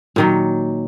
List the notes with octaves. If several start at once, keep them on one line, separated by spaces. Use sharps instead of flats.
A#2 D#3 F#3